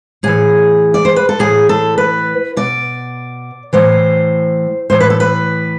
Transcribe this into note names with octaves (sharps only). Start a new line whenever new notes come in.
A2 E3 G#4
D5
C5
B4
A4
A2 E3 G#4
A4
B4
B2 D5
A2 E3 C5
A2 E3 C5
B4
A4
B4